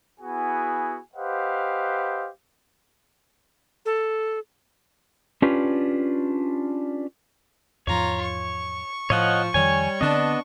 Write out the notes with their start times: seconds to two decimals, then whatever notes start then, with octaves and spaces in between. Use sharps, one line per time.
0.20 B3 E4 F#4 G#4 G#5
1.15 G4 B4 C5 D#5 F5 F#5
3.86 A4
5.42 C#4 D4 F4 G4 B4
7.87 E2 G#2 F3 F4 C#5 A#5
8.21 C#6
9.10 A2 F3 C#5 D#5 F#5
9.54 F2 D#3 F3 G3 C#5 G#5
10.01 D3 B3 C4 D4 D#5